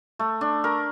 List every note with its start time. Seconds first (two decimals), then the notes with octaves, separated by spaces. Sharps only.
0.19 A3
0.41 D4
0.64 A#4